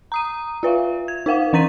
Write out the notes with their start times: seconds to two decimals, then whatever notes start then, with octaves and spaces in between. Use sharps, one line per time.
0.12 A#5 D#6 D#7
0.63 F4 B4 E5 F5
1.08 G#6
1.26 D#4 A#4 F5 F#5
1.53 E3 D4 A#5 A6 B6 D#7